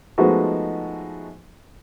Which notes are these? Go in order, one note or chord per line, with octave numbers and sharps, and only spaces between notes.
F3 G#3 A3 B3 D#4 F#4